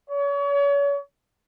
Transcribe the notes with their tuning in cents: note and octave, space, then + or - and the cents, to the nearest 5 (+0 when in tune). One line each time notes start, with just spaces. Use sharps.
C#5 +35